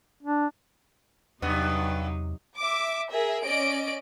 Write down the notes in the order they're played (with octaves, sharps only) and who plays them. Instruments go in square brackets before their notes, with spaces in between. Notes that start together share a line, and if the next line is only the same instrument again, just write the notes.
[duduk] D4
[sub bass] E2 [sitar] G2 B3 [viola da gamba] C3 F#3 D#4
[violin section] E5 D6
G#4 A#4 E5
C#4 D5 D#5 D7